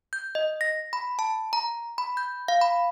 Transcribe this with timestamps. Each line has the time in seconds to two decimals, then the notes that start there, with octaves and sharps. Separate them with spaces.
0.13 G6
0.35 D#5
0.61 A#6
0.93 B5
1.19 A5
1.53 A#5
1.98 B5
2.17 G6
2.48 F5
2.61 B5